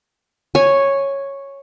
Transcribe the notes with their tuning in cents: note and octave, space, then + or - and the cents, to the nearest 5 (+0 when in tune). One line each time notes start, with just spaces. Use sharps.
C#5 -5 G#5 +0